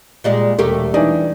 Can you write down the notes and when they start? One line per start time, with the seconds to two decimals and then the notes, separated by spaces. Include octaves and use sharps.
0.24 A#2 G3 G#3
0.59 E1 A3 A#3 G4
0.94 E3 G3 D4 D#4